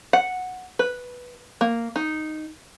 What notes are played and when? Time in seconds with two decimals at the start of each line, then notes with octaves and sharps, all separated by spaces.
0.13 F#5
0.79 B4
1.61 A#3
1.96 D#4